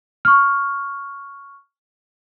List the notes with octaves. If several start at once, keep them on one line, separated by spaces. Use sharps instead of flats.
C#6 F6